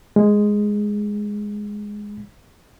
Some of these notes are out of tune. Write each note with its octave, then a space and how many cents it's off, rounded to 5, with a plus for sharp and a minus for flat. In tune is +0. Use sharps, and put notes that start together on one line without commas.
G#3 +0